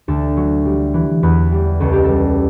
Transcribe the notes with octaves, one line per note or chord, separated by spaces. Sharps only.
D2 A4
F#3
G3
E3
E2 B4
G3
C#2 A4
G4
G3 A4